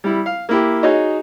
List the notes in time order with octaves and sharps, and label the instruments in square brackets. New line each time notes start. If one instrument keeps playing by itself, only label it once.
[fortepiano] G3 E4
F5
A#3 E4 G4
D#4 F#4 G#4 C#5 D#5